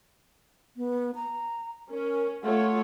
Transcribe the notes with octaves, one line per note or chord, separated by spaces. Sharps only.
B3
A#5
C#4 A#4
A3 F4 C#5 F#5